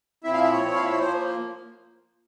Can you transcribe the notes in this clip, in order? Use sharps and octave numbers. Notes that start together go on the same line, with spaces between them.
A#2 F3 C4 E4 E5
F5
E5
C#5
A#2 F3 C4 E4
F5
E5
C#5
F3 A#3 C5